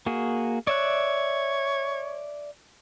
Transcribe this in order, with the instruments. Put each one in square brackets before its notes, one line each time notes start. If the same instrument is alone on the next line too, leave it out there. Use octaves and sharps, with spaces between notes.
[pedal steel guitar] A#3 F#4 G#4
[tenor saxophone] C#5 [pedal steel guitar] D5 E5 F#6